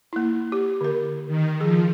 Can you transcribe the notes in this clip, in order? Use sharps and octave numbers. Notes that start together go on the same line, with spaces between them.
A#3 E4
G4
D3 A#4
D#3
F3 G#4